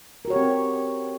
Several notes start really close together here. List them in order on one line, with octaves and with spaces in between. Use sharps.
A#4 F#4 C#5 G4 C4